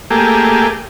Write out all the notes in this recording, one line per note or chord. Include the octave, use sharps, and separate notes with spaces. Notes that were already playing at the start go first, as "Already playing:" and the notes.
A3 A#3 G4 G#4